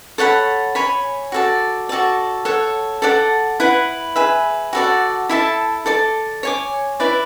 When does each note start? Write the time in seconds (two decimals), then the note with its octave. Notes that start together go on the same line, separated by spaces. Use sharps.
0.18 A4 C#5 F#5 B5
0.75 C#5 G#5 B5
1.32 F#4 A4 D5
1.89 F#4 A4 D5
2.45 A4 C#5 F#5
3.02 A4 D5 F#5 A5
3.60 E4 B4 F#5
4.16 G#4 B4 E5 B5
4.73 F#4 A4 D5 F#5
5.29 E4 A4 E5 A5
5.86 A4 D5 A5
6.43 C#5 G#5 D6
7.00 E4 B4 D5